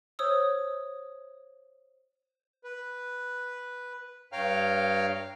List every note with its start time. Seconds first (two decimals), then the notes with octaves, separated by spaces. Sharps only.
0.19 C5 C#5 D#6 E6
2.64 B4
4.33 G2 C#5 F5 G5 A#5 F6